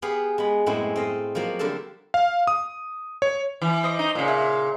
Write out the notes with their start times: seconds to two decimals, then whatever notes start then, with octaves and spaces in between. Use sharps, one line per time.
0.02 B3 G4 G#4 B4 F5
0.38 G#3 B3 B5
0.66 F#2 A2 G#3 B3 C4 E4
0.96 C4 A4 D#5 F5
1.35 F3 F#3 A#3
1.59 D3 G3 C4 A4 A#4 A5
2.14 F5
2.47 D#6
3.22 C#5
3.62 E3
3.83 C5 D#5 D6
3.99 D#4
4.15 A#2 C#3
4.28 E4